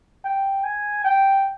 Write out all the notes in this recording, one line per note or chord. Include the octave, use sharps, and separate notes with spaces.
G5
G#5
G5